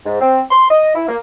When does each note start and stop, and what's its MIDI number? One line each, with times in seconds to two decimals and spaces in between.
0.06 0.18 44
0.21 0.41 60
0.51 0.65 84
0.70 0.90 75
0.95 1.05 64
1.08 1.16 58